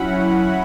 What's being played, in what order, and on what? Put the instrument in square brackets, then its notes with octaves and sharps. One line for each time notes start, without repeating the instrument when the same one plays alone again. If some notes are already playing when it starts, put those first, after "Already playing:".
Already playing: [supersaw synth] F#3 C#4 E4 F#5 B5